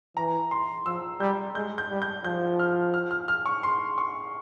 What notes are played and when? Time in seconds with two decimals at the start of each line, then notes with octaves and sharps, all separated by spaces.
0.17 E3 A#5
0.51 C6
0.86 F3 E6
1.20 G3 G6
1.55 G#3 G6
1.78 G6
1.90 G3
2.02 G6
2.24 F3 G6
2.59 F6
2.94 F6
3.11 F6
3.28 F6
3.46 C#6
3.63 C6
3.98 C#6